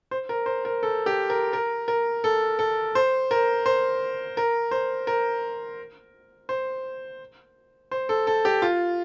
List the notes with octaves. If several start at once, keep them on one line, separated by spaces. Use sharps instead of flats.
C5
A#4
C5
A#4
A4
G4
A#4
A#4
A#4
A4
A4
C5
A#4
C5
A#4
C5
A#4
C5
C5
A4
A4
G4
F4